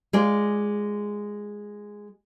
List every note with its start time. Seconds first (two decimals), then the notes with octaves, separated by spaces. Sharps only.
0.13 G#3 F4 G#4 D5